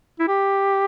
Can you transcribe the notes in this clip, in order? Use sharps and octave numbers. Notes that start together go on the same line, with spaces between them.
E4
G4